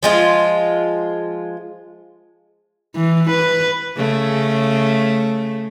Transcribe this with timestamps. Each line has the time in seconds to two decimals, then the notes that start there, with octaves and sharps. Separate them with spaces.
0.03 F3 G#3 F4
2.96 E3
3.30 B4
3.96 C#3 A3